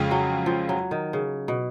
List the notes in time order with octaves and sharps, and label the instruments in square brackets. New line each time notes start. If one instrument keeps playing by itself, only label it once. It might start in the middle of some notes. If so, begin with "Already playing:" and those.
Already playing: [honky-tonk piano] F2 C#3 G#3 C#4 F4
[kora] F#3
F3
F#3
D#3
C#3
B2